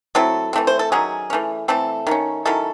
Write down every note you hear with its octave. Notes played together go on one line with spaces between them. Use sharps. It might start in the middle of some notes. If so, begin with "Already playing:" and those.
F#3 A3 C4 E4 A4
E3 A3 C4
C5
A4
D#3 F#3 C#4 G#4
E3 A3 C#4
E3 A3 C4 A4
D#3 A3 C#4
D#3 F#3 C#4 E4 A4